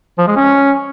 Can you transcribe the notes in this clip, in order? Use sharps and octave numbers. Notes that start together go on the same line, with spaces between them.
F3
G#3
C#4